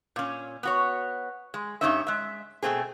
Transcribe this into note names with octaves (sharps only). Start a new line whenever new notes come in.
A#2 C#4
B3 F#4 C#5
G#3
G2 E3 C#4 D#4 C#5 E5
G#3 E5
B2 A3 C4 G#4